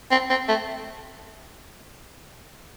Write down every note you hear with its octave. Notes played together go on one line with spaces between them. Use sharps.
C4
C4
A3